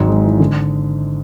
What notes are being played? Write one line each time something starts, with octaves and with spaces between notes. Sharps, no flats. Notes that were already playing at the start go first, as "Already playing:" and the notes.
Already playing: G#1 G#2 F#3
G#3
E3
D3